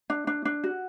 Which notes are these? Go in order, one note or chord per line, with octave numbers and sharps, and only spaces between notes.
D4
D4
D4
F#4